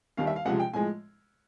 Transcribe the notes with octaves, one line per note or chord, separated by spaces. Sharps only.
D#2 D#3 G3 F5
E5
F5
C#2 C3 F3 G#3 F#5
G5
A2 F3 G#3 G#5